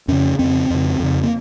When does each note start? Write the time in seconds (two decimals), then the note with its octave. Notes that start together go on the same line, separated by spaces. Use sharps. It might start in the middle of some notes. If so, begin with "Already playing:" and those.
0.08 F2 C#3 C#4
0.39 F2 C#3 C4
0.70 F2 C#3
1.00 F2 C#3
1.23 A#3